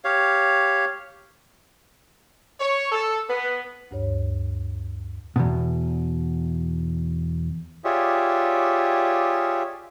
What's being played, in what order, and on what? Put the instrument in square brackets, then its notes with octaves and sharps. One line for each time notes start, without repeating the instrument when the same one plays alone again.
[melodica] G4 C#5 F5
[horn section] C#5
A4
B3
[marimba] D2 G2 C#5
[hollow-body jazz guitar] E2 G#2 B2
[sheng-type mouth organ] F4 G4 G#4 C#5 D5 E5